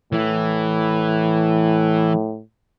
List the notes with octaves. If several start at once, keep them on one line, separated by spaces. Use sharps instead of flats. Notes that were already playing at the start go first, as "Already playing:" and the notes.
A2 E3